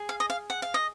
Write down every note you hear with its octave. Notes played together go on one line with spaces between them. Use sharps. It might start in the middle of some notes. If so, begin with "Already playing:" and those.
Already playing: G#4
F5
D#5
F5
F#5
F5
D#5